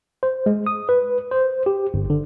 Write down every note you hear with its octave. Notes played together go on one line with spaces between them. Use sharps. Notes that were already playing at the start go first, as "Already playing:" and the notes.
C5
G#3
D#6
B4
C5
G4
G1
D3